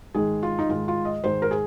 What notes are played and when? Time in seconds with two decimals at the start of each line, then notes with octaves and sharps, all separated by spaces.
0.14 G#2 D#3 G#3 G#4
0.43 F4
0.59 D#4
0.69 G#2 D#3 G#3 F4
0.88 F4
1.05 D#5
1.24 G#2 D#3 G#3 C5
1.42 A#4
1.51 G#4